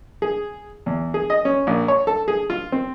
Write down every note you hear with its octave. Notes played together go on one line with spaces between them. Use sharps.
G#4
E2
G#4
D#5
C#4
A#1
C#5
A4
G#4
F4
C4